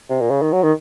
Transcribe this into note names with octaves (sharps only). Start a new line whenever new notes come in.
C3
A#2
C#3
D#3
F#3
D#3